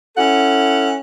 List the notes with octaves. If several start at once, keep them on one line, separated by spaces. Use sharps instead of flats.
C#4 E4 A4 F#5